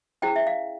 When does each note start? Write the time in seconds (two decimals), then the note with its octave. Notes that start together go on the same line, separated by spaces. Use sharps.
0.22 C#4 E4 G#4 C5 G5
0.36 E5
0.47 F5